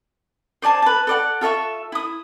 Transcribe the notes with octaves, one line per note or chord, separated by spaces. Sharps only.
C5 D5 G#5 A5
B4 A5
A4 D5 F#5
F4 A4 E5 C#6
E4 D#6